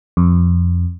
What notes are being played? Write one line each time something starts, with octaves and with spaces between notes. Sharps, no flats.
F2